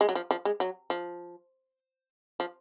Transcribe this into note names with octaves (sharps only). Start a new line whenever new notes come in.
G#3
F#3
F3
F3
G#3
F#3
F3
F3